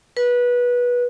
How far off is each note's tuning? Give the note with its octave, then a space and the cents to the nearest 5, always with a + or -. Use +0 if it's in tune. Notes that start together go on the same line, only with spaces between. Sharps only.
B4 -20